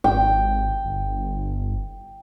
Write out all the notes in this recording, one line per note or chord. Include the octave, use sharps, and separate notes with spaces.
G#1 G5
G1